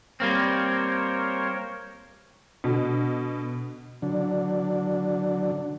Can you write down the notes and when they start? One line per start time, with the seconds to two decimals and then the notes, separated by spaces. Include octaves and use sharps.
0.20 G3 A#3 C4 A#4 C5 C#5
2.64 B2 D3
4.02 D3 F#3 D4